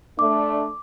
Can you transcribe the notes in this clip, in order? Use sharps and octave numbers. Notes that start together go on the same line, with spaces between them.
A3 D4 D6